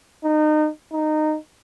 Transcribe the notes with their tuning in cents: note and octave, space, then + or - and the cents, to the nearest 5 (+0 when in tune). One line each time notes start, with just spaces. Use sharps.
D#4 -30
D#4 -15